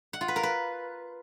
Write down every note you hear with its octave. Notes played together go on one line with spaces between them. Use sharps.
F#5
F4
B4
A#4
B4